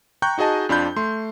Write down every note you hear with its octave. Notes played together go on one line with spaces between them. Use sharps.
G5 A#5 C#6 F#6 G6
D#4 F#4 G#4 D#5 A5
F2 D4 F4 B5 G6
A3 C6